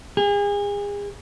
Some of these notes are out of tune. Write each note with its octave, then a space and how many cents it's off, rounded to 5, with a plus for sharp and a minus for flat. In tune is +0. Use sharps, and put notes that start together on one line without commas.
G#4 -35